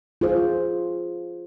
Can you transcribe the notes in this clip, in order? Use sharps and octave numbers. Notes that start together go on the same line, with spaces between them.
F4 G#4 C5